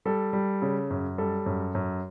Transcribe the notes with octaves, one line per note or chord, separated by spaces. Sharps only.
G3 A4
G3
C#3
F#2
G3 A4
F#2
F#2